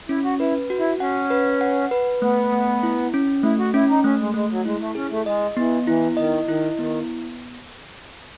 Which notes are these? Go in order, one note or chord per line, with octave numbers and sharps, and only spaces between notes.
C#4 E4
F#4
E4 B4
F#4
E4
C#4 F#5
B4
F#5
B4
A3 B3
A3
E4
C#4
A3 E4
F#4
C#4 E4
D#4
A3 C#4
G#3
G#3 A3
F#3
G#3 E4
A3
C#4 G#4
A3
G#3 D#5
E3 B3
E3 E4
D#3 D#5
D#3 E4
D#3 B3